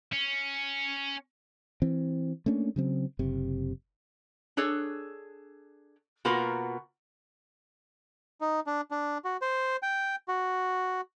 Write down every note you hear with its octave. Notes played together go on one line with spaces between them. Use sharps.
C#4
E3 C4
A3 A#3 C#4 D4
C#3 F#3 C4
F#1 C3
D4 G#4 A4 C#5
B2 A#3 F4 F#4 A#4 B4
D#4
D4
D4
F#4
C5
G5
F#4